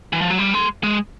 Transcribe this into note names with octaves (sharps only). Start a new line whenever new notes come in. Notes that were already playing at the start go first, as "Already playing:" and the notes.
E3
F3
F#3
G3
G#3
G#3